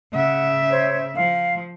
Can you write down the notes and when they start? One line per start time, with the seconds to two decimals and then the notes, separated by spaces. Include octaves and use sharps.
0.13 C#3 E5 F#5
0.70 C5 C#5
1.16 F3 F5